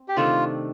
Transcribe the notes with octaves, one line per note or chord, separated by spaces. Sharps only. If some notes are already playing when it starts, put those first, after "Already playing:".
Already playing: C4
G4
C3 D#3 A3 D4 F4